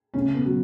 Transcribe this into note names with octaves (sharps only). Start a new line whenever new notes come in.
C#3 C#4
B3
F#3